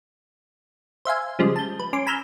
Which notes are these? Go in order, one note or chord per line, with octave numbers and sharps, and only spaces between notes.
C5 E5 F5 G#5
C#3 F3 G3 G#3
A5 G6
B4
C#4 C6 D6
G#5 A#5 B5 E6 F6 G6